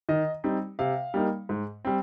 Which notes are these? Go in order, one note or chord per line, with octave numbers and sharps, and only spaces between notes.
D#3 D#5
G3 C4 D#4
C3 F5
G3 A#3 D#4
G#2
G3 C4